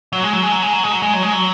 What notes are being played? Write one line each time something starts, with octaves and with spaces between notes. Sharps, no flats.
F#3
G#3
F#3
G#3
F#3
G#3
F#3
G#3
F#3
G#3
F#3
G#3
F#3